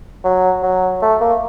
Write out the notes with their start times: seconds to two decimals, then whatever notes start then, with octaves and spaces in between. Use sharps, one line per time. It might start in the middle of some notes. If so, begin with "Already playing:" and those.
0.24 F#3
0.63 F#3
1.02 A3
1.20 A#3